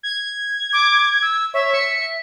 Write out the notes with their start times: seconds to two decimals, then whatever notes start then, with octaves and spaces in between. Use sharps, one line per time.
0.03 G#6
0.73 D6
1.22 E6
1.54 C#5 E5
1.74 C#7